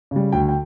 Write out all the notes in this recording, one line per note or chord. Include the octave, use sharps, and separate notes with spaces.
C#3 G3
D2 G5
G5